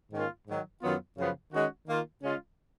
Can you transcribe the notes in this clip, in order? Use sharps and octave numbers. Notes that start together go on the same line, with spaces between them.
G#2 D#3 A#3 C#4 F4
G#2 D#3 F#3
F#2 D#3 F#3 B3 F4
F#2 C#3 F3 B3
D#3 G#3 C#4 F#4
D#3 A#3 F4
C#3 G#3 C#4 F4